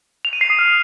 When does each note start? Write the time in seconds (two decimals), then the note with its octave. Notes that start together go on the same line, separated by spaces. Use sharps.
0.25 F7
0.33 D#7
0.41 C7
0.50 D#6
0.59 F6